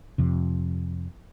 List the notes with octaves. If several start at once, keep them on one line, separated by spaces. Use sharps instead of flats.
F2 C3